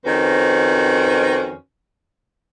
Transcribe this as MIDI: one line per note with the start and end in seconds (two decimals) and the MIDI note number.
0.05 1.53 41
0.05 1.53 51
0.05 1.53 61
0.05 1.53 66
0.05 1.53 71
0.05 1.53 72